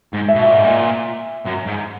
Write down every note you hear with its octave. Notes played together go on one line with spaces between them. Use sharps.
G#2
E5
B2
A#2
G#2
A#2
F#2
G#2